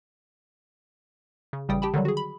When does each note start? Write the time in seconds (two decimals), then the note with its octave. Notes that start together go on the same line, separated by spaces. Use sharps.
1.53 C#3
1.69 A1 C#3 G3 G5 D#6
1.82 G4 G5 A5 B5
1.94 D3 D#3 F#3 G3
2.05 F#4 G#4
2.17 B5